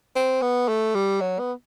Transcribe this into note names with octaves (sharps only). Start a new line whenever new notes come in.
C4
B3
A3
G3
F#3
B3